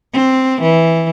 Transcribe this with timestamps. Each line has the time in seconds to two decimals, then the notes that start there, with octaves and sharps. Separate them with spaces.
0.13 C4
0.62 E3